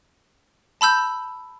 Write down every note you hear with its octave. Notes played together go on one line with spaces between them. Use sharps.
A5 B5 E6 G6